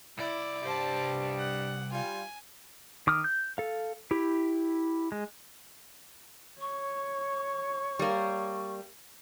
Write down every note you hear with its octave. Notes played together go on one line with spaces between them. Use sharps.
C2 E4 D5
G2 G3 C5 A5
F#5
G3 F4 G#5
D#3 D6 D#6 F6
G6
A4 F5
E4 G4
G#3
C#5 C#6
G3 A#3